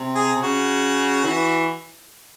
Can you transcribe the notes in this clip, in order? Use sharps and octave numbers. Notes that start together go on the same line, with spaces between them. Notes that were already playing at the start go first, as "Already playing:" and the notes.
Already playing: C3
G#4
C3
C#3 F#4
E3